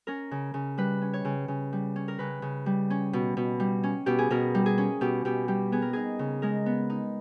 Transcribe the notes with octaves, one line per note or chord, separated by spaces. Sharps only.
C#4 A#4
C#3
C#3
G3 B4
C#4
C#5
C#3
C#3
G3
C#4
A#4
C#3 B4
C#3
G3
C#4
B2
B2
G3
C#4
B2 G4
G#4
B2 A#4
G3
G#4
C#4
B2 G4
B2 G4
G3 G4
B3 G#4
A#4
D#4 G#4
C#3
G#3 A#4
B3
D#4